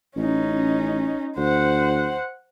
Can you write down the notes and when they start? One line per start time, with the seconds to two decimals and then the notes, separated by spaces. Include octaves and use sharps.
0.16 A1 C#4 D#4
1.37 D2 C5 F#5